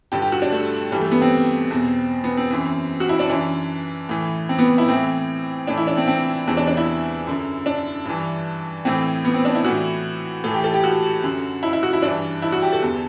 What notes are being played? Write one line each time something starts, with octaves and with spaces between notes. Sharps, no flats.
G2 D3 G4
G4
F#4
D4
A3
G2 E3 G3
A3
B3
C4
E2 B2
B3
C4
F#2 E3
F#4
E4
D4
F#2 E3 D4
A2 E3
C4
B3
E4
A2 E3 C4
A2 E3 D4
E4
D4
C4
C4
E2 C3 E3 C4
D4
D4
E4
F#2 D3
D4
G2 E3
A2 E3 C4
B3
C4
D4
E4
A2 E3 F#4
A2 E3 A4
G4
A4
G4
F#4
F#2 D3
E4
E4
F#4
E4
G2 E3 D4
E4
F#4
G4
A4
E2 D3